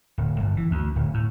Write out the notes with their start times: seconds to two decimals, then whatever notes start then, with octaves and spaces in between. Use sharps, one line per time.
0.18 D1
0.40 G1
0.57 E3
0.71 D2
0.96 D1
1.14 A2